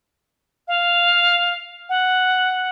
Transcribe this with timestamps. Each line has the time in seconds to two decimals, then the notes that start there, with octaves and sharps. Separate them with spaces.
0.67 F5
1.89 F#5